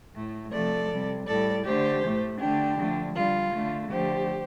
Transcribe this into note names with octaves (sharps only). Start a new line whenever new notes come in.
A2 A3
C3 F3 A3 A4 D5
C3 G3
A2 G3 A4 D5
D3 A3 G4 C5
A2 A3
D3 A3 D4 G4
D3 F3 A3
D3 G3 F4
D3 A3
D3 F3 A3 G4 C5